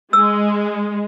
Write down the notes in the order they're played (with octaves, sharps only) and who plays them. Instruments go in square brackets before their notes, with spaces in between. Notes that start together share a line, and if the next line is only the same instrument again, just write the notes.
[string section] G#3 [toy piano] E6